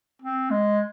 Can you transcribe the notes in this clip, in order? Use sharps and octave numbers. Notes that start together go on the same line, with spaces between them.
C4
G#3